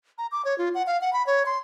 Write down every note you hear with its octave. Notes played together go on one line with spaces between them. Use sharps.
A#5
D6
C#5
F4
F#5
F5
F#5
B5
C#5
C6